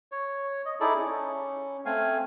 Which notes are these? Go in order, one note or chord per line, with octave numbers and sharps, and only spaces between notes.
C#5
D#5
D#4 E4 G#4 A4 D5
C#4
A3 C4 F5 G#5